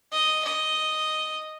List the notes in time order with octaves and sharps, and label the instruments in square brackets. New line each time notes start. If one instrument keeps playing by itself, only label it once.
[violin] D#5
D#5